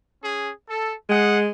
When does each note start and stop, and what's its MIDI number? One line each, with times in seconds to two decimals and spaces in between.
0.22 0.50 61
0.22 0.50 68
0.68 0.93 69
1.09 1.49 56
1.09 1.38 68
1.09 1.38 78